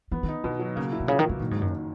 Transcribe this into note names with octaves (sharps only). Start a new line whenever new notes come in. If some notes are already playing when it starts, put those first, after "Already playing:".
E3 B3
D#3
D#4
B2 D#3
F#3
C#3 A#3
E4
B2
A#2 C#3
D#3
C#3 F#3
A#2 D#3
G#2
F#1
F#2